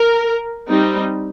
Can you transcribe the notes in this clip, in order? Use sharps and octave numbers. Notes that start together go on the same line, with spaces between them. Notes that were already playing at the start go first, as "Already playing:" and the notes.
Already playing: A#4
G3 C4 D#4